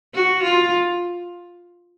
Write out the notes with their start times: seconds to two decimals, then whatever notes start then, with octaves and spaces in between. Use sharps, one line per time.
0.14 F#4
0.43 F4